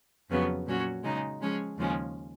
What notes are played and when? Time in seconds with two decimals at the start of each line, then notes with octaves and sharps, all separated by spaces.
0.29 F2 C#3 F#3 B3
0.66 A#2 F#3 C#4 F#4
1.04 C#3 G#3 D#4
1.40 F3 G#3 C#4 G#4
1.77 D#2 C#3 F3 G#3 C#4